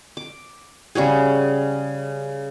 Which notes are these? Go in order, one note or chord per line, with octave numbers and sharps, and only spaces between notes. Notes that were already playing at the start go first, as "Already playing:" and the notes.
D6
C#3 G3 F#4 G#4